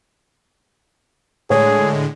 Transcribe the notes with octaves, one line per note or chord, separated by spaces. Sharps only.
A2 D3 G#3 G#4 C#5